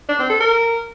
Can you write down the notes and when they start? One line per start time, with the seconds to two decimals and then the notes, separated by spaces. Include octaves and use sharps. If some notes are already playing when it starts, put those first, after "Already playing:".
0.09 D4
0.19 C4
0.30 A4
0.40 A#4